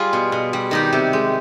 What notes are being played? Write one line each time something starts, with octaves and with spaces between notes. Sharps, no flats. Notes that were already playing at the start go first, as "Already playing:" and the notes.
Already playing: G3 F4 G#4
B2
B2
G3
D#3 D#4 G4
C3
G#3